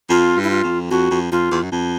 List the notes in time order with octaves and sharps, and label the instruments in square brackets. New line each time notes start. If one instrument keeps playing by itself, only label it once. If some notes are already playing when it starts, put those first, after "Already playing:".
[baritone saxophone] F2 [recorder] F4
[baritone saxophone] G2
[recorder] E4
F4
[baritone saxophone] F2
[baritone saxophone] F2 [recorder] F#4
[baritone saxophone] F2
[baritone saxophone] F2 [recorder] F4
[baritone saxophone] E2
F#2
F2